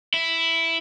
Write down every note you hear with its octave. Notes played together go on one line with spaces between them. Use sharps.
E4